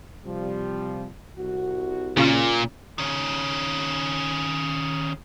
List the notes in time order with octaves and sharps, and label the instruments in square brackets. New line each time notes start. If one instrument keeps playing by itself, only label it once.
[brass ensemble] C3 F3 G3
C2 F#4
[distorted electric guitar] A#2 [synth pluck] C#3 C#4 F4
[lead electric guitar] D#3 C#4